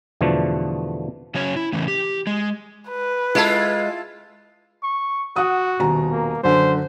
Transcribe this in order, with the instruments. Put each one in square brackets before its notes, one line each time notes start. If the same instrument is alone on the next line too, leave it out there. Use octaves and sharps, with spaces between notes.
[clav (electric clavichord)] E2 B2 D3 F3 A3
[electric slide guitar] C#3 F#3 C#4 C#5
E4
A2 C#3 E3
G4
G#3
[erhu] B4
[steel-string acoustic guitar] G#3 [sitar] E4 F4 A4
[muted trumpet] C#6
[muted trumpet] F#4 [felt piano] F#5 D#6
[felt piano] D#1 B2 A#5
[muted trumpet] A#3
[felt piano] F#2 D3 [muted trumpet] C5